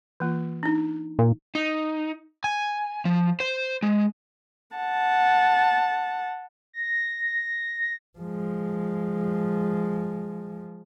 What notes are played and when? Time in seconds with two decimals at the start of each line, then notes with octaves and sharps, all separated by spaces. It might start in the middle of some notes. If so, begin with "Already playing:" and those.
0.20 E3 A#3 F4
0.63 D4 D#4
1.19 A#2
1.55 D#4
2.44 G#5
3.05 F3
3.40 C5
3.83 G#3
4.76 F#5 A5
6.73 A#6
8.19 F3 G#3